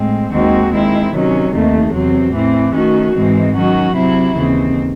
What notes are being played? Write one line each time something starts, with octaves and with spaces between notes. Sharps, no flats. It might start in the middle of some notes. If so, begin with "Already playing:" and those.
Already playing: A2 G#3 C4
D#2 D#3 G#3 C4 F#4
D#3 G#3 C4 E4
C3 D#3 F#3 C#4
D#2 D#3 A3 C4
E2 C3 F#3 C4
A2 E3 C4
D#3 A3 C#4 F#4
G#2 E3 G#3 C4
D#3 F#3 C#4 F#4
C3 F#3 C4 E4
D#2 C#3 E3 C4